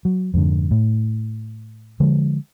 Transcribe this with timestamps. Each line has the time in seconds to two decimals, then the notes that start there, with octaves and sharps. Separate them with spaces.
0.05 F#3
0.34 F2 G#2 D3
0.71 A2
2.00 D3 F3 G#3